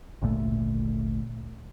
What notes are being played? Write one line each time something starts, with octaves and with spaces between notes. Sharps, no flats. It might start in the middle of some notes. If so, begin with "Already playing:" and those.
G#1 D2 A#2 A3